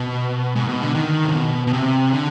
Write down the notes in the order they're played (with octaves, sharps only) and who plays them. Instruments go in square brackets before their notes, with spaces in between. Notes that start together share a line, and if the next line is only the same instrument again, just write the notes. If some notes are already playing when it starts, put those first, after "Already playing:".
Already playing: [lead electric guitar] B2
G#2
B2
D3
D#3
C3
B2
B2
C3
D3